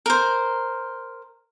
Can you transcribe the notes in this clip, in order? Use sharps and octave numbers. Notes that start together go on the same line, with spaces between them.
A#4 C5